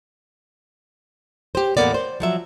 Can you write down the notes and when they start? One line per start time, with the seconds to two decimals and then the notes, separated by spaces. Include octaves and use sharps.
1.55 G4 C5
1.77 E2 A2 F#3 A#3 B3 D5
1.94 C5
2.20 F3 F#3 E5